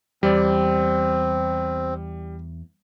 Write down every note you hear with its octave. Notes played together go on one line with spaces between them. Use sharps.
E2 G3 C4 D5